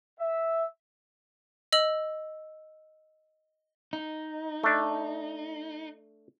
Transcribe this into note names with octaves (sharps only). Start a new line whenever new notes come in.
E5
D#5 E6 F#7
D#4
A3 D4